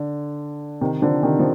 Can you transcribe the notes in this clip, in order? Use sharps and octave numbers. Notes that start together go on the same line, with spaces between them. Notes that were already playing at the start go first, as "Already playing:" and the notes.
Already playing: D3
C3 D#3
D3 F3
C3 D#3
F3